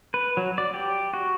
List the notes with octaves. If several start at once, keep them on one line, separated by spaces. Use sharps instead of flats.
B4
F#3
D5
G4
F#4